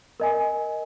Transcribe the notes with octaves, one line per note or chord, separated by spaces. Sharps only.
A#4 D#5 G#5